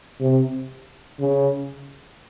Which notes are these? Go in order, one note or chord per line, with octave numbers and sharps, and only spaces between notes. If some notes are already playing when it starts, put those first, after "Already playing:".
C3
C#3